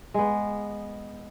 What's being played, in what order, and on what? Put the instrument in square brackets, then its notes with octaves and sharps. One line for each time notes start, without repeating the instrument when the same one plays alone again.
[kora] G#3 B3